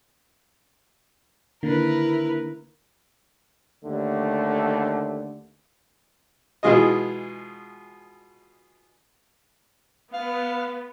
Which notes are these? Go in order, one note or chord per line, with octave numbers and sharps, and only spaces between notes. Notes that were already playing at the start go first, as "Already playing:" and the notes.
D3 D#3 A#3 E4 A#4 B4
D#2 D3 A3
B2 E3 G#3 F4 G#4 D#5
B3 F5